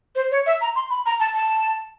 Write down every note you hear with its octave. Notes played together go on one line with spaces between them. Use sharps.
C5
C#5
E5
A#5
C6
B5
A#5
A5
A5